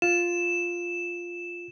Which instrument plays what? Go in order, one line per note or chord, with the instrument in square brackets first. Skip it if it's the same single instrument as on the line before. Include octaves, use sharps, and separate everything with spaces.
[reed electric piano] F4 [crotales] E7